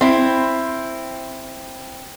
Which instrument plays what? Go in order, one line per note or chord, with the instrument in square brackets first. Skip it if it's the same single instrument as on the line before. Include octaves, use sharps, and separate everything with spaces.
[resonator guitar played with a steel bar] C4 E4